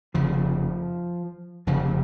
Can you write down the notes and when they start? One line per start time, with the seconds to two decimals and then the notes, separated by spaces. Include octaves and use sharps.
0.14 F1 F2 C#3 F3
1.67 F1 F2 C#3 F3